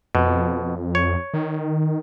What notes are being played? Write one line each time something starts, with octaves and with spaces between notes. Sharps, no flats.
F2 B2
C#5
D#3